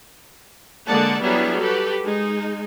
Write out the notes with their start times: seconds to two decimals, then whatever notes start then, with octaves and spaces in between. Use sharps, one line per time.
0.86 D3 G#3 A#3 D5 F#5 A5
1.21 F#3 G3 B3 D4 E4 G#4
1.59 F#4 G4 A4 B4
2.04 G#3 D#4